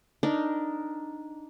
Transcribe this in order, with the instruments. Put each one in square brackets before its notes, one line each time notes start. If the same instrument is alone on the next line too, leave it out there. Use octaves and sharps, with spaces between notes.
[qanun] D4 D#4 A#4